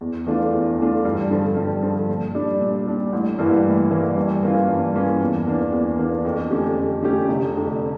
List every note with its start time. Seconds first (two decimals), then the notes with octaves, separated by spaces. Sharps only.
0.01 E2
0.27 E3 A3 D4 F4
0.53 E2
0.79 E3 A3 D4 F4
1.05 G2
1.31 D3 F3
1.57 G2
1.82 D3 F3
2.09 A#2
2.35 G3 D4
2.61 A#2
2.87 G3 D4
3.13 A1
3.39 G2 E3 A#3 E4
3.65 A1
3.90 G2 E3 A#3 E4
4.17 G2
4.43 E3 A#3 C#4 F4
4.68 G2
4.94 E3 A#3 C#4 F4
5.20 E2
5.46 E3 A#3 D4
5.73 E2
5.99 E3 A#3 D4
6.25 F2
6.50 D3 A3 C#4 G4
6.76 F2
7.02 D3 A3 C#4 G4
7.29 F1
7.55 F2 D3